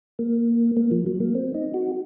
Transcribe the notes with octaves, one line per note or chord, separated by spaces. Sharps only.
A#3
A#3
F3
F#3
A#3
C4
D#4
F#4